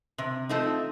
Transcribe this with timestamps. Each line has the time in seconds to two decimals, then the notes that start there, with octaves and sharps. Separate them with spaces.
0.18 C3
0.49 F3 A3 C4 D#4